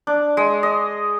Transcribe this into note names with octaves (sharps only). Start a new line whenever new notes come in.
D4
G#3
D#5